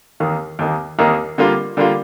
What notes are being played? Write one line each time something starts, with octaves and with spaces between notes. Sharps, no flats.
D#2 D#3 A#3
D#2 D#3 A#3
D#2 D#3 A#3
D3 G3 A#3 F4
D3 G3 A#3 F4